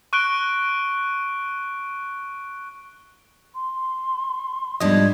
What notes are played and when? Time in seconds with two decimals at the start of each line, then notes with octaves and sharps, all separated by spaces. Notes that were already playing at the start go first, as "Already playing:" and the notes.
0.13 C#6 F#6 D7 G7
3.55 C6
4.80 G#2 F3 G3 B3 D4 D#5 G#6